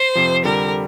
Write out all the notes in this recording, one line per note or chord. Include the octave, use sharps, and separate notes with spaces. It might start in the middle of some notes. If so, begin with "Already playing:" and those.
Already playing: C5
F2 C3 F3
F2 D3 G3 A#4